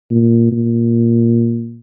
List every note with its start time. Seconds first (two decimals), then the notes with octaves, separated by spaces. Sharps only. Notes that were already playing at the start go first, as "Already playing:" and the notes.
0.11 A#2
0.52 A#2